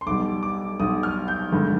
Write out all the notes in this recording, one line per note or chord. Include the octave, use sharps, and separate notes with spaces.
C6
B1 B2 G3 D6
D6
B1 B2 G3 D#6
F6
G6
G1 G2 D#3 G#3